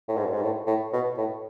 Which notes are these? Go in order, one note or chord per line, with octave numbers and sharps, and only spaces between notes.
A2
G#2
F#2
G#2
A2
A2
B2
A2